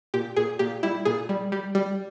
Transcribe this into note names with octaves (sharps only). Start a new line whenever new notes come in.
A#2 G4
A#2 G#4
A#2 G4
G3 E4
A#2 G#4
G3
G3
G3